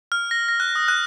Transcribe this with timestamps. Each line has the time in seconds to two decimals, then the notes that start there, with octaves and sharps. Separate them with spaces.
0.12 F6
0.31 A#6
0.49 A#6
0.60 F#6
0.76 D#6
0.88 F#6